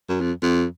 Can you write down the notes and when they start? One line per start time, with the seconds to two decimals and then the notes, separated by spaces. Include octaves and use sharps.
0.09 F#2
0.21 F2
0.43 F2